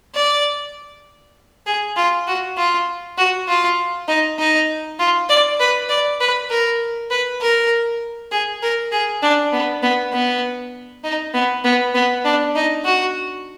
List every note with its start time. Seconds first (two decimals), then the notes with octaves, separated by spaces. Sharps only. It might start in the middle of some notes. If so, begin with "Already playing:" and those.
0.15 D5
1.66 G#4
1.97 F4
2.27 F#4
2.57 F4
3.18 F#4
3.48 F4
4.08 D#4
4.39 D#4
4.99 F4
5.29 D5
5.60 B4
5.89 D5
6.21 B4
6.50 A#4
7.11 B4
7.41 A#4
8.32 G#4
8.63 A#4
8.92 G#4
9.23 D4
9.53 B3
9.83 B3
10.13 B3
11.04 D#4
11.34 B3
11.64 B3
11.94 B3
12.25 D4
12.55 D#4
12.85 F#4